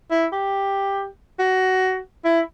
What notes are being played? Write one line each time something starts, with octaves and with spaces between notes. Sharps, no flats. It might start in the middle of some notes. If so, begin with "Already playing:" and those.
E4
G4
F#4
E4